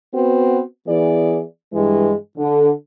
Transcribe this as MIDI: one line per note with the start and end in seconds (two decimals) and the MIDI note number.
0.13 0.59 59
0.13 0.59 60
0.13 0.59 66
0.13 0.59 71
0.87 1.40 52
0.87 1.40 59
0.87 1.40 68
0.87 1.40 74
1.72 2.13 43
1.72 2.13 52
1.72 2.13 56
2.37 2.69 50